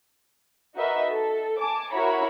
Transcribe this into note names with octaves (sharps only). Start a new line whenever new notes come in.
D#4 F#4 A#4 B4 D#5 E5
A4
G#5 A5 D6
E4 F#4 A#4 C#5 A#5 B5